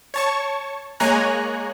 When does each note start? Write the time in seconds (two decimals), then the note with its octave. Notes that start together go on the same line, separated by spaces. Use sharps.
0.14 C#5 A5 C#6
1.00 G#3 A#3 C#5 G#5 A#5 F#6